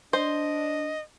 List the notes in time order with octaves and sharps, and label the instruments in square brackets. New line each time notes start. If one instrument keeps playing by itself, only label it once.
[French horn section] D4 [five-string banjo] C5 [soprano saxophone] D#5